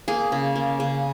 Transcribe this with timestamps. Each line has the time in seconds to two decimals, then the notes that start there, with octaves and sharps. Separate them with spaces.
0.08 A#3 G#4
0.32 C#3
0.56 A#3
0.80 C#3